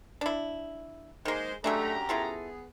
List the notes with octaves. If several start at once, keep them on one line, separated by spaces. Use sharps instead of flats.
D4 E4
D#3 G#3 A#3 C5
F#2 F#3 G#3 A3 D4 G4 A#5
B3 E4 F4 G#4 A4